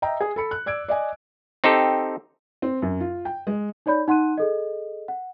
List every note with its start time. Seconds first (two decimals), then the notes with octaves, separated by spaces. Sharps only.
0.02 D#5 E5 G5 A#5
0.21 G#4
0.36 A4 B5 C#7
0.51 F#6
0.66 D5 E6 G#6 D7
0.88 D5 D#5 G#5
1.64 C4 D#4 G4 A4
2.62 C4
2.82 F#2
3.00 F4
3.25 G5
3.47 G#3
3.86 D#4 C#5 D5 B5 G6
4.08 D#4 F#5 C6 F#6 D#7
4.38 G#4 A4 D#5
5.08 F#5